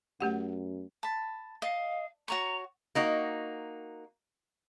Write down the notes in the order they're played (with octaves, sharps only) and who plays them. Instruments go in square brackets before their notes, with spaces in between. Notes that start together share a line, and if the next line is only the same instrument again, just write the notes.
[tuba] F#2 [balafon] A3 G4 F#5
[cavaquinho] A5 B5
[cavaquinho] D#5 [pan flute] F5
[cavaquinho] F#4 C#5 C#6 [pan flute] A#5
[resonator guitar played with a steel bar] A#3 D#4 F#4